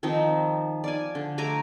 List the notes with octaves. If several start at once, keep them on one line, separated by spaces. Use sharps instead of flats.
D#3 F3 C4 D#4
D5 F5 G#5
D3
A3 G#5 A#5 D6